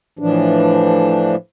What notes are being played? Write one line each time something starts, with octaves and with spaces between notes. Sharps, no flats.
A2 E3 F3 D4